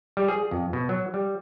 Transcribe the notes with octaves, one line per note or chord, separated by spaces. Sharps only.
G3
G#4
F2
B2
F#3
G3